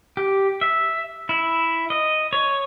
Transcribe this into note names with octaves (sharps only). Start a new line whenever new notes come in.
G4
E5
E4
D#5
C#5